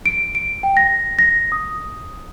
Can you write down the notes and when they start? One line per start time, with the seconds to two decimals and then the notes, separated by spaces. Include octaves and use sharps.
0.06 D7
0.35 D7
0.63 G5
0.77 A#6
1.19 A#6
1.52 D#6